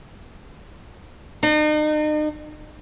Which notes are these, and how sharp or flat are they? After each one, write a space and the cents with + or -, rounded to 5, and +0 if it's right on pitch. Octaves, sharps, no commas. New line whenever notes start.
D#4 -40